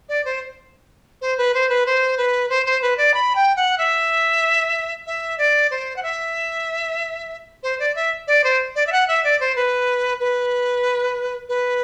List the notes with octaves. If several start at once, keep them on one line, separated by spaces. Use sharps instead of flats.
D5
C5
C5
B4
C5
B4
C5
B4
C5
C5
B4
D5
B5
G5
F#5
E5
E5
D5
C5
F#5
E5
C5
D5
E5
D5
C5
D5
E5
F#5
E5
D5
C5
B4
B4
B4